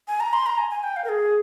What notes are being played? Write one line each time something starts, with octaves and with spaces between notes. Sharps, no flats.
G#5
A#5
C6
A#5
G#5
G#5
G5
F5
A#4
G#4